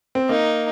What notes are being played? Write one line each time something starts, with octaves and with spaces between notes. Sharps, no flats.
C4
A#3 D#4